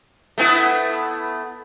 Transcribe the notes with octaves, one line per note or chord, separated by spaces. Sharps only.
A3 B3 E4